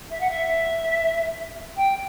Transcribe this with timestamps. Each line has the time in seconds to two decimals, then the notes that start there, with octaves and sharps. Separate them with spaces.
0.10 E5
0.20 F#5
0.30 E5
1.76 G5